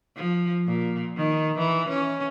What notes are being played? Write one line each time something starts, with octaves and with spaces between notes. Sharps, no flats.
F3
A#2
D#3
E3
C#4